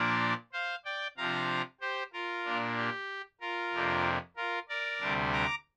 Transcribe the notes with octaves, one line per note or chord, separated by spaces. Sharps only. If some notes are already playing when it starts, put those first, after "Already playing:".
Already playing: A#2 F3 A#3 D4 A#4 D5
C5 F5
D5 G5
C3 F3 D4 F5 A#5
G4 C5
F4 A#4
A#2 A#3 D4
G4
F4 A#4
F2 C3 A#3 D4
F4 A#4
A#4 D5
D2 C3 G3 D4
A#5 D6